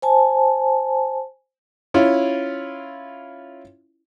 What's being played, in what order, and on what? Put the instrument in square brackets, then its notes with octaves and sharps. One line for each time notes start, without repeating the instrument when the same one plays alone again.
[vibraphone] C5 G#5 A5
[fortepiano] C#4 E4 F4